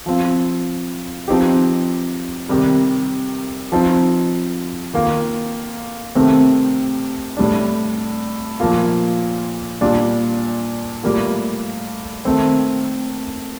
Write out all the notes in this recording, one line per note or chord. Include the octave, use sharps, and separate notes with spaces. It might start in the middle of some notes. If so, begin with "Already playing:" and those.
F3 C4 F4
F3 C4 D#4 G4
C3 D#3 G3
F3 C4 D#4
D#3 A#3 F4
C3 D#3 A3 C4
A2 G3 D4
A#2 F3 A#3 F4
A#2 G3 D4 F4
A2 G3 A#3 F4
D#3 A3 C4